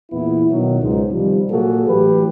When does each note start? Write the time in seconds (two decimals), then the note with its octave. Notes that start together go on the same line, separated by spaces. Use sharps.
0.11 E2 A#2 B3 E4
0.50 B2 D#3 F#3
0.81 C#2 G#2
1.12 C3 D#3 F3 G3
1.50 A#2 F#3 A#3 F#4 G#4 A4
1.87 A2 E3 F#3 G4 B4